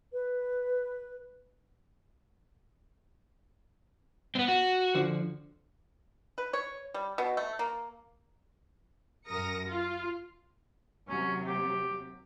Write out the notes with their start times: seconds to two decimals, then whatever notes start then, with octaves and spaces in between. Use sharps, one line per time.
0.13 B4
4.35 B3 C4
4.48 F#4
4.95 D3 F3
6.38 B4
6.53 C#5
6.94 G3
7.18 B2
7.37 A3
7.59 A#3
9.26 F#2 A#4 D#6 A#6 C#7
9.67 F4
11.09 D#2 C3 F#3 C#4
11.47 G4